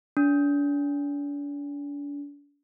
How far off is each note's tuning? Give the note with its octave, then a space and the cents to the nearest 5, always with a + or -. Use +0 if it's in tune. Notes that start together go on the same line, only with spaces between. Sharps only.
D4 -40